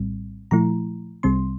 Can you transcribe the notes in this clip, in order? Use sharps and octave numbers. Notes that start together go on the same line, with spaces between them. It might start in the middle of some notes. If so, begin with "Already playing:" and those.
Already playing: A#1 A2 G3 C4
A#2 F3 A3 E4 A#5
C2 C3 G3 C4 C6